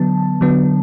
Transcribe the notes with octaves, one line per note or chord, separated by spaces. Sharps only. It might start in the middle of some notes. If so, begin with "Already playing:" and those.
Already playing: D3 F#3 B3 A5
D3 F#3 B3